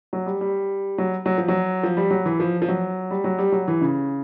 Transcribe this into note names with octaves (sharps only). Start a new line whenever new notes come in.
F#3
G3
G3
F#3
F#3
F3
F#3
F3
G3
F#3
E3
F3
F3
F#3
G3
F#3
G3
F#3
E3
C#3